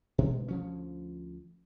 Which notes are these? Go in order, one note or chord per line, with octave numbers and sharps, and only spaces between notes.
B2 G#3
D2 F3 C#4